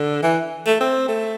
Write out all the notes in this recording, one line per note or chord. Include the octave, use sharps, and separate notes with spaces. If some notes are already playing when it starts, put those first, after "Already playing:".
Already playing: D3
E3
A3
C4
A3